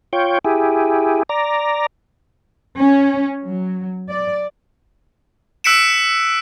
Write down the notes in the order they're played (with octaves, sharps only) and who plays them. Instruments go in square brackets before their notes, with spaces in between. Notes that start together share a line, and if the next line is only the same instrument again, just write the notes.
[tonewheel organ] F4 C#5 G5
E4 G4 G#4
D5 A#5
[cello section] C#4
F#3
D5
[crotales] E6 F#6 B6 C#7 D7 E7